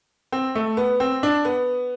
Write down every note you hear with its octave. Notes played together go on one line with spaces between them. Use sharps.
C4
A3
B3
C4
D4
B3